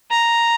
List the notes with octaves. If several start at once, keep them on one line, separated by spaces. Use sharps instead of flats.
A#5